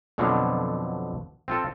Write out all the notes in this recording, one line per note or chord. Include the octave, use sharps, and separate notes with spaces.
F2 B2 D3 F3 F#3
C4 F4 A4